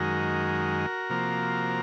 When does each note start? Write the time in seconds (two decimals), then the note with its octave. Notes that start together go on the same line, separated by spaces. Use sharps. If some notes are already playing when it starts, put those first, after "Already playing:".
Already playing: F#2 D#3 G#3 F#4 A#4
1.10 C3 F3 A#3